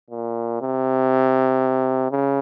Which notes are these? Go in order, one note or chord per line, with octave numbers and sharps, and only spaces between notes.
A#2
C3
C#3